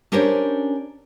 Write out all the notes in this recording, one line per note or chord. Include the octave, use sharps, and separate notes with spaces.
C#4 D4 G4 A#4 C5 C#5